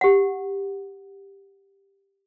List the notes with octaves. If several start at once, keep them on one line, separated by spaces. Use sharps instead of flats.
G4 F#5